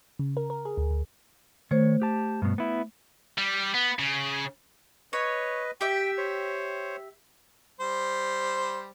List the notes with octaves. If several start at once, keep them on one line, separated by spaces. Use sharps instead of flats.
C#3
A#4
A#4
G#4
D2
D2
D#3 A3 C5 C#5
G4 A5
G2 B2
B3 E4
G3
B3
C#3
B4 C#5 D#5
G4 E5 G5
C5 C#5
G3 C5